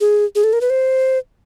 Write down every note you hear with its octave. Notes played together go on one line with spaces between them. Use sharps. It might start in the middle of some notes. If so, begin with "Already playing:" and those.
G#4
G#4
A4
A#4
B4
C5